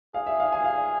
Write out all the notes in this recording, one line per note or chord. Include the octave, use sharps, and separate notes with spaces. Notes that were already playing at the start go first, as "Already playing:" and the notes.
G#4 F5
E5
F5
G#5
F5